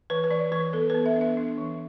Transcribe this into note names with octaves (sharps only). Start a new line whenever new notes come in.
E3 B4
B4
E3 D5
E3 B4
B3 A4
B4
B3
E5
D4
E5
D4
E3